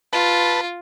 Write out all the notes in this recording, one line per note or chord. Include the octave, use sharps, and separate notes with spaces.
F4 B4 A5